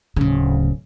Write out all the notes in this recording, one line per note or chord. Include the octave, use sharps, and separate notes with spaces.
D1 C#3